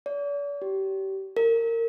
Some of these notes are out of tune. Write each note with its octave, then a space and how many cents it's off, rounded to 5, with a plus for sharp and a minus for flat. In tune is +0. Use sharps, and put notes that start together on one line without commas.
D5 -45
G4 -25
A#4 -25